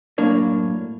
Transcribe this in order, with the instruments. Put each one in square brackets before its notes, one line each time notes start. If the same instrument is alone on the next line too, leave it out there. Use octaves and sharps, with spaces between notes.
[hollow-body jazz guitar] F#2 A2 A#3 D4 C#5